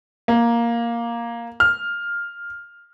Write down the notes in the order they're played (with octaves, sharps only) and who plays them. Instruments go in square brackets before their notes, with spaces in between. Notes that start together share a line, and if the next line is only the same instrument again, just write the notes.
[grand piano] A#3
F6